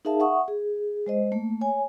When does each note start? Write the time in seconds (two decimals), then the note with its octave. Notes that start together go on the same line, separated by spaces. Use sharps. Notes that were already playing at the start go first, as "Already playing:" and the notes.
0.05 D#4 G#4 A#4 E5 F5 A5
0.20 E5 F#5 C#6 D#6
0.48 G#4
1.06 G#3 C5 D#5
1.32 A3 A#3
1.61 C#5 G#5